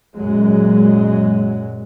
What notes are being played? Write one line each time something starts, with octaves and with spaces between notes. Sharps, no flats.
F#2 A#2 F#3 G#3